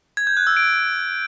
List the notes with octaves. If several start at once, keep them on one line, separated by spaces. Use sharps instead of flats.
G#6
G6
F#6
E6
D7